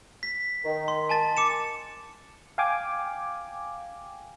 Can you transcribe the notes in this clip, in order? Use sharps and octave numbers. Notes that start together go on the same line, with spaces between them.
B6
D#3
C6
G#5 A5 A6
D6 C#7 E7
F5 G5 G#5 D6